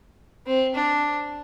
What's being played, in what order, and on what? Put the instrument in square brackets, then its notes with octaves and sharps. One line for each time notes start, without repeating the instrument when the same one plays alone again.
[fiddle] C4
D4